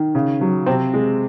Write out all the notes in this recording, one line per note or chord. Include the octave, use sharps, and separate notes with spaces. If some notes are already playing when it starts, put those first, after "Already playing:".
Already playing: D#3
C#3
F#3
C3 C4
G#3